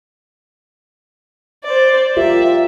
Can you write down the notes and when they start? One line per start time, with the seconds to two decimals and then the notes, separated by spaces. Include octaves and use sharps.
1.64 C5 D5
2.17 F4 G4 A#4 E5